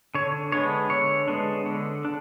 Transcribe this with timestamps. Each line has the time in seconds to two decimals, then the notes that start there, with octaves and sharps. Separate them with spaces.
0.15 D3 C#5
0.52 G#3 B3 D4 C#5
0.90 D3 C#5
1.28 G#3 B3 D4
1.66 D3
2.05 D4